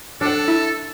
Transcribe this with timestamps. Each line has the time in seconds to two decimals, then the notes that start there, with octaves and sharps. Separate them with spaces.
0.21 D4 A4 F#5
0.48 E4